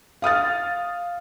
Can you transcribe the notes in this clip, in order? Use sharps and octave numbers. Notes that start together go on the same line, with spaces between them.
F5 D#6 F6 A6